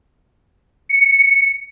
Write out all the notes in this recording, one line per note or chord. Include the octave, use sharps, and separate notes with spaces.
C#7